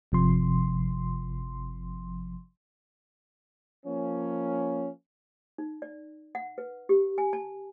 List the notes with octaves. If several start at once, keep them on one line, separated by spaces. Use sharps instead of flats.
G1 C3 F3 C6
F3 A#3 C#4
D#4
D5
F#5
B4
G4
G#5
A5